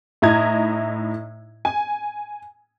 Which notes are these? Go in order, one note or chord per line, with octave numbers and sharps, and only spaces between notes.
A2 D#4 E4 D#5 A#5 G#6
G#5